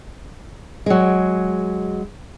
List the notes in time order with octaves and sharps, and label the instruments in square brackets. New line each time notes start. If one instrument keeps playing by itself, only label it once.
[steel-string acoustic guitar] F#3 G#3